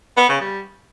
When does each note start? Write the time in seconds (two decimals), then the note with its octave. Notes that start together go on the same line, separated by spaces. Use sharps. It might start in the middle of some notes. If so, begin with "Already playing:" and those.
0.17 B3
0.29 C#3
0.41 G3